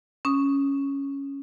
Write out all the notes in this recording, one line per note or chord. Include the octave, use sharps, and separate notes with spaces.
C#4 D#6